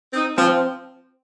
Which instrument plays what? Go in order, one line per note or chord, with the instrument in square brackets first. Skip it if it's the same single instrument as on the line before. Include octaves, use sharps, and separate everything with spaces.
[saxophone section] C4 D#4
[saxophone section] F3 [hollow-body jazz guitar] C4